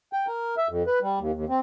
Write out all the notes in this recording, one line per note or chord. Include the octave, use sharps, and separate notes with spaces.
G5
A#4
E5
F2
B4
G3
D#2
D#2
C4